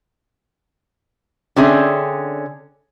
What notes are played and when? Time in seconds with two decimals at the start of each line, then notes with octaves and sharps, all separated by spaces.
1.56 D3 C4 C#4 G#4 E5